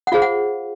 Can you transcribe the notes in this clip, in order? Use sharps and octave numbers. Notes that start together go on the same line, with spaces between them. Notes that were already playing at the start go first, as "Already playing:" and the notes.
F#5
F4 G#4 C5 F5
F#5